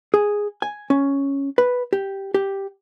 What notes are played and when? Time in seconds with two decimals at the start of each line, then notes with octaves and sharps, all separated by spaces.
0.14 G#4
0.62 G#5
0.90 C#4
1.58 B4
1.93 G4
2.34 G4